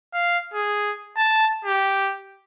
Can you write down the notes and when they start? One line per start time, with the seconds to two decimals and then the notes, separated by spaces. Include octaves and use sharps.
0.14 F5
0.54 G#4
1.17 A5
1.65 G4